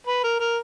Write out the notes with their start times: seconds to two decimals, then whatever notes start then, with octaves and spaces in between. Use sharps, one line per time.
0.07 B4
0.24 A#4
0.40 A#4